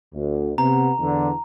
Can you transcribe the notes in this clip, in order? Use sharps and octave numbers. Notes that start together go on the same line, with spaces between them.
D2
C3 B3 A#5
E2 D3